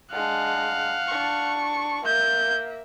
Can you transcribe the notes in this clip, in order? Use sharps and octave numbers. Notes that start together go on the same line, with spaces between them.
G#3 D4 F5 F#5
D4 C#6
A#3 E5 G6